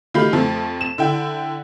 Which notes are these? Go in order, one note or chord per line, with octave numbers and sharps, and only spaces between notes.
D#3 A3 F4 G4 B5
F2 F3 A3
E7
D3 E4 G5